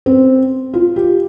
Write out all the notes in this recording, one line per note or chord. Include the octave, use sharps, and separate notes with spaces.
C4
F4
G4